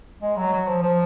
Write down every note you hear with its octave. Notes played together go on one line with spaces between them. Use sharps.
G#3
F#3
F#3
F3
F3